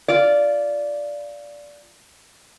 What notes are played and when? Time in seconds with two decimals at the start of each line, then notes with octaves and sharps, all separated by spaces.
0.08 F4 D5